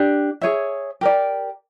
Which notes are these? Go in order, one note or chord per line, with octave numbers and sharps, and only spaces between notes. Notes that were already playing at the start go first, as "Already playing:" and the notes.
Already playing: D4 G4
G#4 C#5 E5
G4 A#4 D5